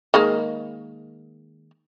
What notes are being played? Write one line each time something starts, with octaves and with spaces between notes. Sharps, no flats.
D#3 G#3 A#3